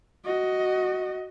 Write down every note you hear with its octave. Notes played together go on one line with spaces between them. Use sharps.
F#4 D#5